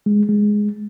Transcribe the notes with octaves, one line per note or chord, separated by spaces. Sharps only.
G#3
G#3